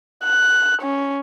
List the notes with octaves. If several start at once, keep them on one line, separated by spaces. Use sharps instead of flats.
F#6
C#4